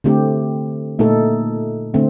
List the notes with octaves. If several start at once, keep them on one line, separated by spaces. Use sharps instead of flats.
D3 A3 C4 G4
A#2 A3 D#4 A4
D3 A3 C4